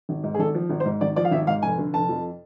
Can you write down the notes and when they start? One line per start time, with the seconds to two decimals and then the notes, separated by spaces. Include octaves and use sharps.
0.09 G#1
0.23 G#2
0.34 G#4
0.39 G#1 A4
0.54 F3
0.70 G#1
0.80 C5
0.85 G#2
1.01 G#1 D5
1.16 F3 D5
1.25 F5
1.31 G#1 E5
1.47 G#2 F5
1.62 F1 G#5
1.78 D3
1.93 F1 A5
2.09 F2